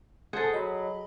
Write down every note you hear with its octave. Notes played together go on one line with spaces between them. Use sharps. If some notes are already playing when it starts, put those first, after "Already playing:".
G#4 A4 C5 F#5 D#6
F#3 D#5 B5